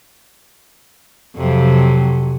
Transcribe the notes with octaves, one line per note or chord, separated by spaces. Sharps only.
F2 C3 F#3